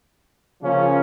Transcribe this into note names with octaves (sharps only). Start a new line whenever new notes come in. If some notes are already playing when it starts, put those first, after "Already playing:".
C#3 F3 A#3 C#4 F4